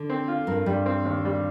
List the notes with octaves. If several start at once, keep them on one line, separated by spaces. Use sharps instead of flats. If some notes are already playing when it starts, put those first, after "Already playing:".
Already playing: D3
C4
F4
G2 A#4
G2 G3
C4
D#2
G3